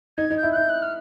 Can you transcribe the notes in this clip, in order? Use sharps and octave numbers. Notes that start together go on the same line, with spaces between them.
D#4 G#6
D#4
G6
E4
F#6
E4 G6
F#6
F6